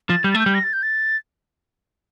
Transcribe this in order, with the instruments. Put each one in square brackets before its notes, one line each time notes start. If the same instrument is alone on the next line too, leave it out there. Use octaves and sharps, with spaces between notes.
[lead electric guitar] F3 [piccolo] A6
[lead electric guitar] G3 [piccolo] G6
[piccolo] A6
[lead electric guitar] A3 [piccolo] G6
[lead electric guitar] G3
[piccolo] A#6
A6
G6
A6